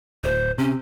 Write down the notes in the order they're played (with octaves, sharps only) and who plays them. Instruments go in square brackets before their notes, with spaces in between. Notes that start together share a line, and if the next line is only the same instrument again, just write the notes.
[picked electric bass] D1 [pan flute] C5
[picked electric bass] C3 [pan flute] C#4